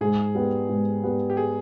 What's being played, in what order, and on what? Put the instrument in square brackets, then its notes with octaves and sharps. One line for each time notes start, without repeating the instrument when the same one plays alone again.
[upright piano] G#2 [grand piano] G#4
[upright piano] G3 B3
G#2
G3 B3
[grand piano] G4
G#4